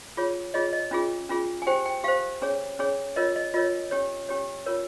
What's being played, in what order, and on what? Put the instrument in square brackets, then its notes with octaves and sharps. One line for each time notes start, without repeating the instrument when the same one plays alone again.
[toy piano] F4 G#4 C#5
F4 G#4 C#5 D#5
D#5
C#4 F4 G#4
C#4 F4 G#4
G#5
G4 C5 G5
G5
G4 C5 F5
C#4 G#4 C#5
C#4 G#4 C#5
F4 A#4 C#5 D#5
D#5
F4 A#4 C#5 D#5
C#4 G4 C#5
C#4 G4 C#5
F4 A#4 C#5